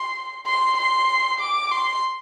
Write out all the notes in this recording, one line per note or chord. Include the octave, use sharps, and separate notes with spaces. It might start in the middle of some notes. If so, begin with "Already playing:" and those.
Already playing: C6
C6
C6
D6
C6